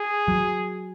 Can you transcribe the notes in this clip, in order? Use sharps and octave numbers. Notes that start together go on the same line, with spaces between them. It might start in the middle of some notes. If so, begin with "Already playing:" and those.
Already playing: G#4
F#3